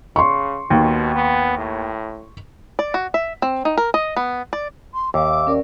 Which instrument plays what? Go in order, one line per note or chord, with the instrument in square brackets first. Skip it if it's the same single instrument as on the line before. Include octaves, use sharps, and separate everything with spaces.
[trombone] C#3 [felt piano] C6 C#6
[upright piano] D#2 [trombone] B2
[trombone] B3
A2
[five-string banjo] D5
F#4
E5
C4
D#4
A#4
D#5
B3
D5
[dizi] C6
[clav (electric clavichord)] D#2 [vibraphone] E5 F5 E6 [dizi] D6
[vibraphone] C#4 A#4 D5